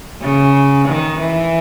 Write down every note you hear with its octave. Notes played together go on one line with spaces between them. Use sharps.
C#3
D#3
E3